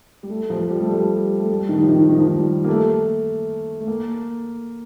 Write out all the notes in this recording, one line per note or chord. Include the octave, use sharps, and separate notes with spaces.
G3
A3
F3
G3
A3
G3
A3
G3
D#3
F3
D#3
D#3
F3
D#3
G3
A#3
A3
A3
A#3